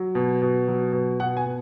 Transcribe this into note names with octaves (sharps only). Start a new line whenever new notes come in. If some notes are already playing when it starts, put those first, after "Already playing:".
Already playing: F#3
B2
B2
F#3
B2
B2 F#5
G#5
B2